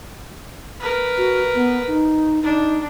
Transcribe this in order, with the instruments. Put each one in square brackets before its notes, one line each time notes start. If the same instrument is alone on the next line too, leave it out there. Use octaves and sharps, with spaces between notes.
[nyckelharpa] A#4 B4
[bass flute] F#4
B3
D#4
[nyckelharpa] D4 [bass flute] D#4